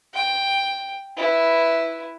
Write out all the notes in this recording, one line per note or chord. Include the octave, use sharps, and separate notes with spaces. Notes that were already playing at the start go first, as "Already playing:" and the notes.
G5
E4 B4